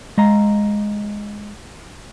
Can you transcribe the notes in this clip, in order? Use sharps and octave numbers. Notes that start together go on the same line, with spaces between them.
G#3 D#5 F5 A#5